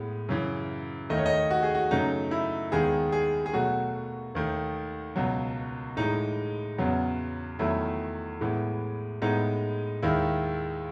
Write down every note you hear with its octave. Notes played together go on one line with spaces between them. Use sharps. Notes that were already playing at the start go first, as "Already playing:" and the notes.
Already playing: A2 G#3 B3
F#2 C#3 E3
D#2 D#3 A3 D#5
C#5
D#5
F#4
G#4
F#4
F#2 C#3 F#3 A3 D#4
E4
D#2 D#3 G#3 B3 G#4
G#4
G#4
B2 F#3 A3 F#4
D#2 D#3 A3
C#2 B2 F#3
A2 E3 G#3 D#4
E2 C#3 F#3 B3
E2 D#3 F#3 A3 E4
A2 E3 G#3 B3
A2 G#3 B3 D#4
D#2 D#3 G#3 E4